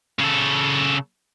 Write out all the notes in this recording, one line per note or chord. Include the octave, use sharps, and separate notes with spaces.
C#3 A4